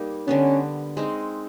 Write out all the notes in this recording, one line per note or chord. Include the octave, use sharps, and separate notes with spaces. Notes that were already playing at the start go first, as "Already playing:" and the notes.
Already playing: G3 A#3 D#4
D3 G3 B3 C#4
G#3 C4 D#4